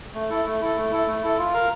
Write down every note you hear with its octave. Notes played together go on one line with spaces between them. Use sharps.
A3
E4 A4
A3
E4 A4
A3
E4 A4
A3
E4 A4
F4
A#4 F5